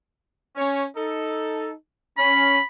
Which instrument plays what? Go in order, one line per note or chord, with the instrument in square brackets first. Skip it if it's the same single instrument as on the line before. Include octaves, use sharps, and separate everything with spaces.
[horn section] C#4 C#5
D#4 A4
[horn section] C#4 [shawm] B5